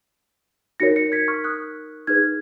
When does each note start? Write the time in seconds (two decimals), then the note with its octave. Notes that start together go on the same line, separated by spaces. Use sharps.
0.80 D#4 F#4 A#4 C#5 A#6 C#7
0.96 A#6 C#7
1.12 G#6 B6
1.28 C#6 F6
1.44 D#6 F#6
2.07 D#4 G#4 B4 F6 G#6